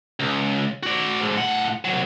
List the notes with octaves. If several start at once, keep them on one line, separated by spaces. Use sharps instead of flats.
C#2
F#4 D5
G#2 D3
A2 F#5
C2 F#3